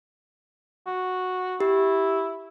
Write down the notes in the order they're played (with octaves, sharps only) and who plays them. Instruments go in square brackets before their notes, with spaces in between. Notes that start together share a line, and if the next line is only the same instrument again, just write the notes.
[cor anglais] F#4
[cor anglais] E4 [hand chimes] G4